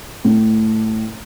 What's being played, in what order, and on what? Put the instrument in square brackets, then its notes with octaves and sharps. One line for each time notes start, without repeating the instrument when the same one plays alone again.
[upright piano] A2